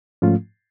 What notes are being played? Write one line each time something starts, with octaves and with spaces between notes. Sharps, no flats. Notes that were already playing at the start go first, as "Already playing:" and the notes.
G#2 F3 A3 C#4 F4